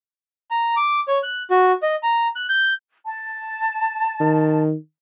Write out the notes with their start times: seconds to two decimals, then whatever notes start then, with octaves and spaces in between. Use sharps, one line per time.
0.51 A#5
0.76 D6
1.08 C#5
1.23 F#6
1.51 F#4
1.82 D#5
2.03 A#5
2.36 F#6
2.49 G6
3.05 A5
4.20 D#3